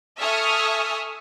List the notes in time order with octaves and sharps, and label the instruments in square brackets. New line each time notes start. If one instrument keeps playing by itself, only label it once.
[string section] A4 E5 G#5 C#6 D#6 F6